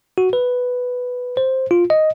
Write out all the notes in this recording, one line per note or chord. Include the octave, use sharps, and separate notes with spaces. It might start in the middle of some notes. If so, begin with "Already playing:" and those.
F#4
B4
C5
F4
D#5